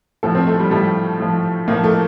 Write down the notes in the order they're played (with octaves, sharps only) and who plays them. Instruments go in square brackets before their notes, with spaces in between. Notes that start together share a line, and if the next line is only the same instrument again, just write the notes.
[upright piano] A2 F3 A4
C4
A3
G3
A2 F3 G3
A2 F3
A2 F3 A#3
A3